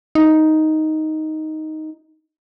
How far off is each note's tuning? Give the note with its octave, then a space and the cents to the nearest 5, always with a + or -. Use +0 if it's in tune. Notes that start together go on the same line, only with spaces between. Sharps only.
D#4 +5